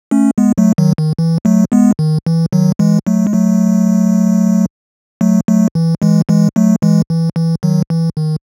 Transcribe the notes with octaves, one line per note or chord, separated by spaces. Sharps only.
A3 C#4
G#3 B3
F#3 A3
D#3 F#3
D#3
E3
F#3 A3
G#3 B3
D#3
E3
D#3 F#3
E3 G#3
F#3 A3
G#3
F#3 A3
F#3 A3
F#3 A3
E3
E3 G#3
E3 G#3
F#3 A3
E3 G#3
E3
E3
D#3 F#3
E3
D#3